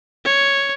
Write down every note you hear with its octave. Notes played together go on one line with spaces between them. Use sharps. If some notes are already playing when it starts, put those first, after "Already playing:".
C#5